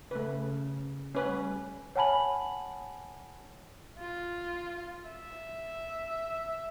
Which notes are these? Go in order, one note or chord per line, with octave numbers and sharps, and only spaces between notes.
C#3 A3 B4
G3 A3 C#4 B4
C#5 F#5 G#5 A5 B5 F#7
F4
E5